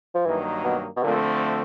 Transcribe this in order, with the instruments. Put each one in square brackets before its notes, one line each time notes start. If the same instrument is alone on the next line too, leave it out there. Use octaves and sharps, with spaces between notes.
[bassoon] F3
[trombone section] G2 D#3 F#3 A#3 D#4 [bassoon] E3
[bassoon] B2
B2
[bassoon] A#2 [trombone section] D3 F3 A3 C4